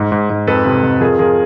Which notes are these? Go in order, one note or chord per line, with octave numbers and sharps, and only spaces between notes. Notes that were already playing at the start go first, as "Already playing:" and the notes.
Already playing: G#2
G#2
G#2
F2 A4 B4
C3
F2
F3 G#4 A#4
F3 G#4 A#4